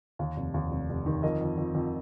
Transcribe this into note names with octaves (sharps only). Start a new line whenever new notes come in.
D#2
F1
D#2
F1
F1
D#3
F2 A#4 D#5
F2
F2
F2